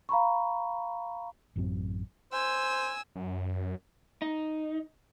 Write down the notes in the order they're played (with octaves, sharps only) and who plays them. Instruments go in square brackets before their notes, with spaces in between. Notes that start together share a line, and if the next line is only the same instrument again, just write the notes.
[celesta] F5 A#5 B5 C#6
[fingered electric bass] A1 F#2 F#3 C4
[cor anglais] C5 [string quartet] G#5 E6
[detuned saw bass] F#2
[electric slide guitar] D#4